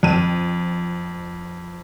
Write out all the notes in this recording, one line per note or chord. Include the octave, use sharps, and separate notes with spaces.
F2 D#7